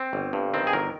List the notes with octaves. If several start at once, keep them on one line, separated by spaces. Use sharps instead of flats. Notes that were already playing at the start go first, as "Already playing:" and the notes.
Already playing: C4
G1
G2
D#3 C4
G#4
G1 A#4